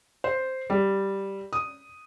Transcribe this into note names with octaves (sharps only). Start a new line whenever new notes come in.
C5
G3
D#6